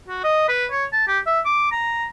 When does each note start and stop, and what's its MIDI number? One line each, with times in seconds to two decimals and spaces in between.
0.08 0.22 66
0.23 0.44 75
0.48 0.66 71
0.71 0.85 73
0.92 1.06 81
1.07 1.19 67
1.26 1.40 76
1.45 1.70 86
1.72 2.05 82